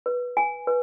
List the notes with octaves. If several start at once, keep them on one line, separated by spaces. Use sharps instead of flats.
B4
G#5
B4